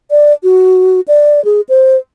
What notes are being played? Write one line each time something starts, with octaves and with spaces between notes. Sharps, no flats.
D5
F#4
D5
G#4
C5